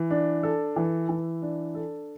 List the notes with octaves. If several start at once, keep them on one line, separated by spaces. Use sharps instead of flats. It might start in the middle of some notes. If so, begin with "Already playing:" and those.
Already playing: E3
D4
A4
E3
E3
D4
A4